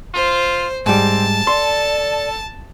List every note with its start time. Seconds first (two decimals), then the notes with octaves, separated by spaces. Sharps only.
0.15 F4 C5
0.86 G#2 G3 C4 A5
1.47 A4 D5 C6